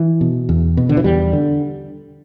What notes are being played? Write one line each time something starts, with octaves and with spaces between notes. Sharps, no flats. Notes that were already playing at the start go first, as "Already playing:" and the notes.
Already playing: E3
B2
E2
B2
D3
E3
E2 G3
D3